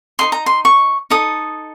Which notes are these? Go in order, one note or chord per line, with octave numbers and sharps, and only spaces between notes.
D#4 A#4 D#5 C6
A#5
C6
C#6
D#4 A4 D#6